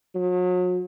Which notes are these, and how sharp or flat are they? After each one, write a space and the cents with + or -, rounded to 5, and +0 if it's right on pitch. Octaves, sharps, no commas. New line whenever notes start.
F#3 -40